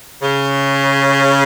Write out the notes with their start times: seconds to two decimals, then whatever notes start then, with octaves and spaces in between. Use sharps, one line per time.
0.22 C#3